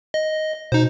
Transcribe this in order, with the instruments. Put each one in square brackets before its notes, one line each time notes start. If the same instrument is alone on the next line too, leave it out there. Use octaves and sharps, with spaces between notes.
[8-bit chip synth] D#5
[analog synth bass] B2 [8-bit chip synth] D#4 C5